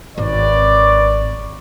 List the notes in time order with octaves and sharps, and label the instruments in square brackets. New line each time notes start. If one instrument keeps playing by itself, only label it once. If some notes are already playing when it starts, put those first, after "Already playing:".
[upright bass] G#1 [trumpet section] B4 C#5 D5